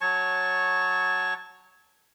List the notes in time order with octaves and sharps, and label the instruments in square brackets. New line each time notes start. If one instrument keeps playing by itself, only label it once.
[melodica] F#3 C#5 A5 C#6